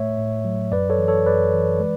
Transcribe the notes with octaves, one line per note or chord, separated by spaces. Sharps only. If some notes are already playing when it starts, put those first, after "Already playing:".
Already playing: A2 A3 C#5 E5
A2
F#3
F#2 B4 D5
A4 C#5
E3
A4 C#5
F#2 B4 D5
E3
G#3